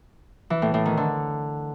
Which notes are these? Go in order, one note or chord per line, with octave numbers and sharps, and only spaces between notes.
E3
A2
A2
D#3
D3